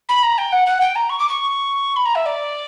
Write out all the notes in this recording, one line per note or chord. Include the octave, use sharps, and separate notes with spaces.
B5
A#5
G5
F#5
F#5
G5
A#5
C#6
D6
C#6
B5
A#5
E5
D5